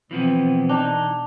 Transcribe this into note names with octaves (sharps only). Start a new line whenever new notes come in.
B2 E3 F3 B3 C4
E3 D4 D#4